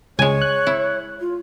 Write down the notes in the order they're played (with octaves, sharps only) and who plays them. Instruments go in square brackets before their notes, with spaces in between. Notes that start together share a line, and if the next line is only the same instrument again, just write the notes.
[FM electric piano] C#2 [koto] G#3 G#5 [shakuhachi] C#5
[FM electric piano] F#6
[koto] E4
[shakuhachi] F4